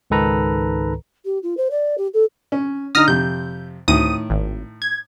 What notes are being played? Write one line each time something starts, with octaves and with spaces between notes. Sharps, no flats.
C#2 G#2 D#3 A4 B4 A#5
G4
F4
C5
D5
G4
A4
C#4
D3 D#4 D#6 F6 A#6
F2 C3 G6
D2 A2 D#3 D#6 D#7
G#1
G#6